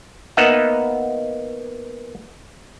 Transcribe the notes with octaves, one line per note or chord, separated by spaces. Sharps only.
A#3 B3 D#4 D#5 E5 F#5